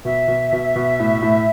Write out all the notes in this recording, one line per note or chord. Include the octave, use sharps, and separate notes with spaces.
B2 E5
B2
B2
B2
A2
A2